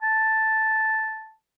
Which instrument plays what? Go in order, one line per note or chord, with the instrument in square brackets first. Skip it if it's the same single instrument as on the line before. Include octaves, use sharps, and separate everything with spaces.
[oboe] A5